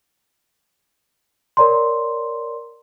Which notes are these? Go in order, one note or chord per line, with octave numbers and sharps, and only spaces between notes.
A#4 C#5 D5 A#5 C6